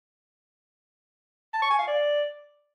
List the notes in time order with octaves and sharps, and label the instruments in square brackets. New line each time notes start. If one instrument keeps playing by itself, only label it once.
[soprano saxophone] A5
C#6
G#5
F5
D5